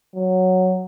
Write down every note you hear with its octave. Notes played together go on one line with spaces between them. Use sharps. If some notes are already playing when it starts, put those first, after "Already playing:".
F#3